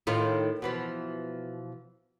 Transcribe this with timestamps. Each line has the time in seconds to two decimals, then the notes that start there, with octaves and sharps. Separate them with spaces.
0.07 A2 D#3 F4
0.62 B2 E3 F3